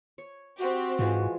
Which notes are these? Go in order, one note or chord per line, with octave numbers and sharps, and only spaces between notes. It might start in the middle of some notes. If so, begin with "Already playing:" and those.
C#5
C4 F#4 G4
G#2 E3 F3 G#3